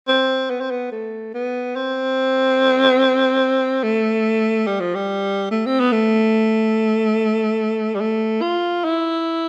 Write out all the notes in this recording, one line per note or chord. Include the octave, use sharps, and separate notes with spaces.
C4
B3
C4
B3
A3
B3
C4
A3
G3
F3
G3
A3
C4
B3
A3
G3
A3
F4
E4